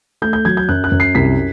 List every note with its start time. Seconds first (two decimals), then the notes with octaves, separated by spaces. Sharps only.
0.22 A3 G6
0.33 G6
0.45 F#3 G#6
0.57 G6
0.69 F#2 F#6
0.84 F#6
0.92 F#2
1.00 C7
1.15 C2 B6